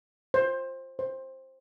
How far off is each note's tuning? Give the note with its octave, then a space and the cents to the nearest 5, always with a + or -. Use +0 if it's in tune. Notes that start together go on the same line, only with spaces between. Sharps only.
C5 +15
C5 +15